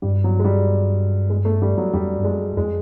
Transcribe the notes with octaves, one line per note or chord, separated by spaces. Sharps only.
G2 G3
F#3
G#3
G3
G#3
A3
G3
F#3
F2 G3
G2
F#2 G#3
F2 G#3